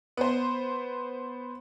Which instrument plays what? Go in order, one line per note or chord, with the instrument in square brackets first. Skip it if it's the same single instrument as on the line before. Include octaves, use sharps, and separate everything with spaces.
[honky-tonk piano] B3 B4 C5